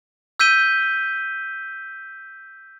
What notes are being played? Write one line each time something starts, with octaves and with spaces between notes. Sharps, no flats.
E6 G6 B6 D#7 G7